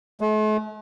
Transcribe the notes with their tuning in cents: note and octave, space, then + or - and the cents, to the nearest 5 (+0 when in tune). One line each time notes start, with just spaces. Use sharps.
A3 -45